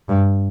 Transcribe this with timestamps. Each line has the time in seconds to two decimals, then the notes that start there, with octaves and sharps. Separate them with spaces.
0.09 G2